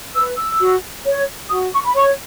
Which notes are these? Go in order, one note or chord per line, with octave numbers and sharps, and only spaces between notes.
B4 E6
E6
F#4
C#5
F#4 D#6
C#6
B5
C#5 C#6